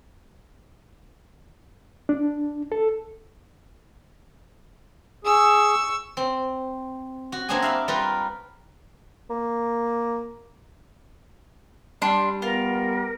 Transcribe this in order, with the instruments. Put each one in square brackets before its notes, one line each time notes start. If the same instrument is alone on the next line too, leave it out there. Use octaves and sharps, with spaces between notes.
[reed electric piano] D4
A4
[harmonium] G#4 [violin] C#6 E6
[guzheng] C4
F#4
A#3 C4 D4 F#4 G#4 G#5
E5 F5 B5
G3 F4 A#4 B4
[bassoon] A#3
[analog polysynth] G3 [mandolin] D4 C6
[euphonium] B3 [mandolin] F4 [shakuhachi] A#4